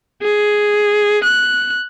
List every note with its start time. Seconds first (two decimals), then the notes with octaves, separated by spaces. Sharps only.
0.22 G#4
1.24 F#6